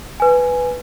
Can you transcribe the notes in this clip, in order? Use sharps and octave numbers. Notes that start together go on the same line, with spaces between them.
B4 G#5